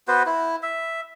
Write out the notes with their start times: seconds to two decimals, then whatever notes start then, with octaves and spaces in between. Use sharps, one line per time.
0.08 B3 F#4 B4 C5
0.26 E4
0.63 E5